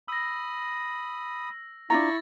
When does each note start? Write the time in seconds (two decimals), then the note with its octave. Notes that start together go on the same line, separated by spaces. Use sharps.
0.08 B5 D#6 E6 A#6
1.90 D4 E4 F4 A#5 C#6 A6 A#6